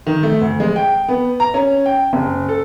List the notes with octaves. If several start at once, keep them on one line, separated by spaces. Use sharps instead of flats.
D#3
A3
D2
G#3
G5
B3
A#5
C#4
G5
F#1
A4